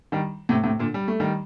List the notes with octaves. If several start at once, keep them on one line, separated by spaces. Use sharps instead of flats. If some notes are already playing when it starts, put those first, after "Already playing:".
D#3 G3
A2 C3
A2 C3
A#2 D3
G3
A3
D#3 G3